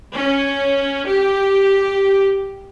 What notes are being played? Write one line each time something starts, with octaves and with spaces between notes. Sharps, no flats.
C#4
G4